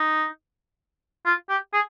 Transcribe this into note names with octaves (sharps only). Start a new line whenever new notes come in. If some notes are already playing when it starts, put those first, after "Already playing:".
Already playing: D#4
F4
G4
G#4